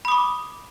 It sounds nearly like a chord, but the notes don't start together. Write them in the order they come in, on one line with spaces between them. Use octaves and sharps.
B5 D#6 D6